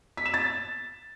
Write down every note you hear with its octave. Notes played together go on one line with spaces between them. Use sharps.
B6
E7
A6